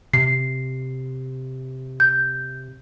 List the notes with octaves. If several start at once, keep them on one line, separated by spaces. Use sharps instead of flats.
C3 C7
G6